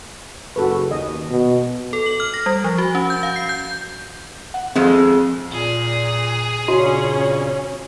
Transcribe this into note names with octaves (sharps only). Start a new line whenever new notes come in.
F#1 F#4 A4 B4
D#2 D#5
B2
A4
F#7
F6
A#6
G3
F3
F#4
C#4
G6
F5
C7
G6
F#5
F2 G#3 C4
A#2 G#4
G2 A#2 C#3 C#4 F#4